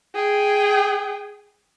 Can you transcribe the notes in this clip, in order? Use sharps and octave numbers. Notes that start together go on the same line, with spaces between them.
G#4 G5